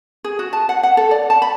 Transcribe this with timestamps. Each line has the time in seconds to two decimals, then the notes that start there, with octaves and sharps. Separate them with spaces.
0.24 G#4
0.39 F#4
0.53 A5
0.69 F#5
0.83 F#5
0.97 A4
1.11 D5
1.30 A5
1.42 B5